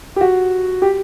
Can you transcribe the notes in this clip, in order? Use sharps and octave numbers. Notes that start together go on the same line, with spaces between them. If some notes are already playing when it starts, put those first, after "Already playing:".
G4
F#4
G4